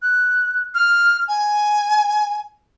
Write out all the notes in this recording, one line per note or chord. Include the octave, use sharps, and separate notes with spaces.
F#6
F6
G#5